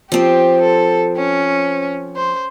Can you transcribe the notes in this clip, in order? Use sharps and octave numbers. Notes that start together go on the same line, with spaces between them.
F3 C4 G4
A4
C#4
C5